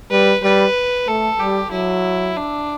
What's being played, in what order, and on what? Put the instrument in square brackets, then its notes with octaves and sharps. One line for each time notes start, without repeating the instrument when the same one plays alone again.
[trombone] G3 [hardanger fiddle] B4
[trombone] G3 [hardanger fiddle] B4
[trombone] A3 [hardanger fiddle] A4
[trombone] G3 [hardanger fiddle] G4
[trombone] F#3 [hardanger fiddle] E4
[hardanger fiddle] D4